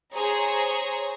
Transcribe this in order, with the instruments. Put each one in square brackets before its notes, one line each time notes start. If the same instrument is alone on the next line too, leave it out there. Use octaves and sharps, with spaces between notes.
[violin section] G#4 C5 C#5 A#5